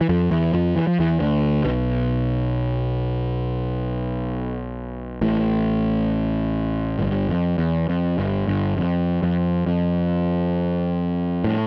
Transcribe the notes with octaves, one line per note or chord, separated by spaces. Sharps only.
E3
F2 F3
E2 E3
F2 F3
E3
F3
E2 E3
D2 D3
B1 B2
A1 A2
G1 G2
F2
E2
F2
G1 G2
G1 G2
F2
F2
F2
A2